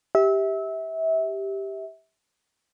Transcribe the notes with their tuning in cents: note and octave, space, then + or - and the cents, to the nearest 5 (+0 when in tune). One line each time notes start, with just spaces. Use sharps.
G4 +0 E5 -25